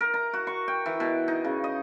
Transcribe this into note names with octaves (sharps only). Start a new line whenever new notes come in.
A#4
A#5
F#4
C#6
G5
E3
B2
D#4
C#3
D#5